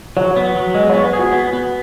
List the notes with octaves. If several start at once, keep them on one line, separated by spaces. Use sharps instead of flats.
F#3 C#5
B3
F#3
G#3 D#5
C#5
B3
B4
G#4
F#4
B3
B3